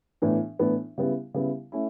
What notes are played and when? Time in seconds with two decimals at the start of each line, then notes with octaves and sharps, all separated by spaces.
0.22 A2 E3 B3 D4
0.59 A2 E3 B3 D4
0.98 C#3 G3 B3 E4
1.34 C#3 G3 B3 E4
1.72 A3 C#4 E4